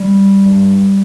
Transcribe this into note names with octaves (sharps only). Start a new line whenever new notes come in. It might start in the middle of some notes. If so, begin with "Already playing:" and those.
Already playing: G3
G2